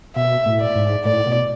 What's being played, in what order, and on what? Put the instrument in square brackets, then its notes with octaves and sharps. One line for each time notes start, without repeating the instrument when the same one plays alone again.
[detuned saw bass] B2 [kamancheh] E5
[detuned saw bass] A2
[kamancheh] D5
[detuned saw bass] G#2
[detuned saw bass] A2 [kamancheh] D5
[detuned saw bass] B2